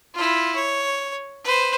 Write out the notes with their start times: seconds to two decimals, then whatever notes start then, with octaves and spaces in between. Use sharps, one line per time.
0.14 E4 F4
0.55 C#5
1.45 B4 C5